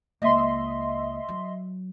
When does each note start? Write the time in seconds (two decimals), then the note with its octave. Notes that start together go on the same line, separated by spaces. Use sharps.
0.22 C#2 A#3 D#5 E5 C6
1.29 F#3